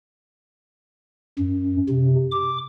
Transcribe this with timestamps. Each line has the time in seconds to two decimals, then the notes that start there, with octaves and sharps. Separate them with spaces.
1.39 F#2
1.89 C3
2.31 D6